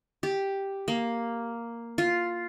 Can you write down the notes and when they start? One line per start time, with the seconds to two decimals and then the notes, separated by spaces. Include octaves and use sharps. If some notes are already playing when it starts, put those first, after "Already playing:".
0.23 G4
0.88 A#3
1.98 F4